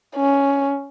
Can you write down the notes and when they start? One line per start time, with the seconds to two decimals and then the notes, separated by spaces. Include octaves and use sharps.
0.16 C#4